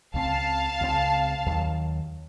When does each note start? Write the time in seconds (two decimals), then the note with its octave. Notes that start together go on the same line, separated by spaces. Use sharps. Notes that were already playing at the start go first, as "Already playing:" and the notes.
0.14 C#2 C#3 A3 C4 F5 A5
0.81 C#2 C#3 A3 C4
1.46 D#2 D#3 F#3